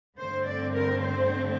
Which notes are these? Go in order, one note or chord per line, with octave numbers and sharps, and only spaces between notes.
G2 D3 A3 C4 C5
D5
A#4
C5